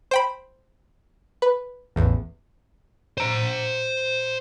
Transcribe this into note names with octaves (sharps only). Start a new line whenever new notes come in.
C5 G5 B5
B4
A1 E2
C5 A#5